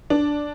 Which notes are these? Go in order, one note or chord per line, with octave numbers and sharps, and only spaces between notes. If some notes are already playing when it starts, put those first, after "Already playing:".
D4